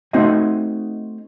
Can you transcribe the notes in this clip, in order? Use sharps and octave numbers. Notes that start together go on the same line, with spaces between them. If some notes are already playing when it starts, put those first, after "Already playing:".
A3 C4 D#4 F#4 D#5 E5